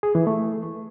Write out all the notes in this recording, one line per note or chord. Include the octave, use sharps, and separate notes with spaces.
G#4
E3
A3